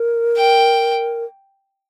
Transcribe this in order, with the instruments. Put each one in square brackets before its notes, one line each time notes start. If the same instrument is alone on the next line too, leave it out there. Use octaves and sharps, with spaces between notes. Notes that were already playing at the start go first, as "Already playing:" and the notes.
Already playing: [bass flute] A#4
[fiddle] G5